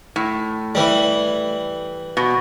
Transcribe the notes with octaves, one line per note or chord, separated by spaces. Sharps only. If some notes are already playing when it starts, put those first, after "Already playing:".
A2
E3 G3
B2